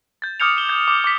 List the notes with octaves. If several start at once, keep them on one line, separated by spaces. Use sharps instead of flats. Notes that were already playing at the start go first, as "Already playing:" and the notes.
G6 A6
D6 D#6 F6 G6 C#7 F7
E7 G7
G6
D6
D6 B6